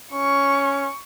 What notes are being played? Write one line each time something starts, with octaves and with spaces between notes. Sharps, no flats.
C#4 C#6